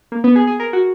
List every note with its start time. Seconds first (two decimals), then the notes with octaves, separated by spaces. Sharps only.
0.12 A#3
0.24 B3
0.36 G#4
0.47 G#4
0.60 A#4
0.73 F#4